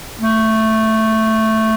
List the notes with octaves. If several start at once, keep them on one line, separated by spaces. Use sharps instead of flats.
A3